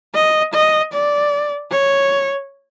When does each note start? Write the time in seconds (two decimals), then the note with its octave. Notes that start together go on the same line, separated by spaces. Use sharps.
0.15 D#5
0.54 D#5
0.93 D5
1.71 C#5